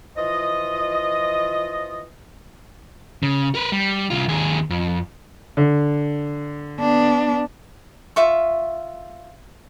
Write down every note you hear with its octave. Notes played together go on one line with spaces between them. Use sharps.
E3 F3 F4 D#5
C#3
A#4 B4
G3
C2 F4
D#2 G#4
F2
D3
B3 D4
F4 E5 C#6